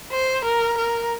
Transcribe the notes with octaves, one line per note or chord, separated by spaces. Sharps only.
C5
A#4
A#4